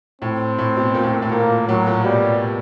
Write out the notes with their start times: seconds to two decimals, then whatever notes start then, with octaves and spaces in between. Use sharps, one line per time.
0.21 A2 C4
0.58 A2
0.77 B2
0.95 A#2
1.03 A2
1.13 A#2
1.22 A2
1.32 A#2 A#3
1.68 A2 F#3
1.87 A#2
2.04 B2 G3